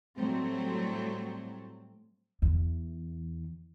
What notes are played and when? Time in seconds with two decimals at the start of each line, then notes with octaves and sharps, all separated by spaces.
0.17 A2 F#3 G3 A3 C4
2.42 E2